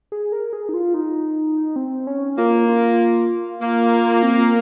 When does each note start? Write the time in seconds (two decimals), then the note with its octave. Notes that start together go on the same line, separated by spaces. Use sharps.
0.12 G#4
0.32 A#4
0.53 G#4
0.69 D#4
0.74 F4
0.94 D#4
1.76 C4
2.07 C#4
2.38 A#3 F4
2.69 F4
3.61 A#3
4.23 C4